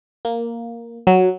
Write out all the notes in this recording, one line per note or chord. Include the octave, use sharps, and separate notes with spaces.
A#3
F#3